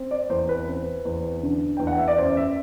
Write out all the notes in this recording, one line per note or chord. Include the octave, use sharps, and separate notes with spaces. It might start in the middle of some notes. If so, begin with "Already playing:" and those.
Already playing: C4
D5
E2 C5
B4
C4 B4
E2
D3
E2 G5
F#5
E5
D5
F#2 C5
E5